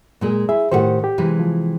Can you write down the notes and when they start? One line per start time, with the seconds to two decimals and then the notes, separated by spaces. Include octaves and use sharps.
0.21 A#2 G#3 G#4
0.49 E4 G#4 E5
0.71 A2 D#3 G4 A4 C5 F#5
1.04 G4
1.18 C3 E3 G#3
1.40 F3